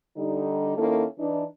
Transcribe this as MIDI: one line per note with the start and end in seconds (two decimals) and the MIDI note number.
0.16 0.76 50
0.16 0.76 55
0.16 0.76 63
0.77 1.04 51
0.77 1.04 58
0.77 1.04 61
0.77 1.04 64
0.77 1.04 69
1.19 1.43 52
1.19 1.43 62
1.19 1.43 63